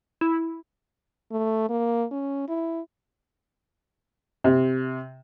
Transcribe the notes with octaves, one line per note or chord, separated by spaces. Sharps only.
E4
A3
A#3
C#4
E4
C3